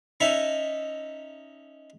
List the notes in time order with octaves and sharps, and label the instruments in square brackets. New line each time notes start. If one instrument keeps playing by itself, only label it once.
[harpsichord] C#4 D#4 E5 A5